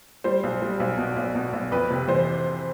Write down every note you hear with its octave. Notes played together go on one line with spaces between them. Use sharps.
G3 C5
B1
G3
B1
B2
B1
B2
B1
F2 B4
C3
E3 C5